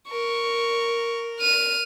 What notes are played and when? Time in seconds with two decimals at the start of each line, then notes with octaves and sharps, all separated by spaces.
0.11 A#4 C#6
1.39 F6 D#7